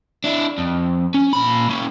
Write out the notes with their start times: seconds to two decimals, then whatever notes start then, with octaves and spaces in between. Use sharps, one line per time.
0.24 D4 E4
0.58 F2
1.14 C#4
1.33 A#2 B5
1.69 A#3 C#4